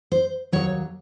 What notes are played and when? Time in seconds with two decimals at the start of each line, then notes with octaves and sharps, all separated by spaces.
0.12 C5
0.52 D#2 D#3 F#3 C#5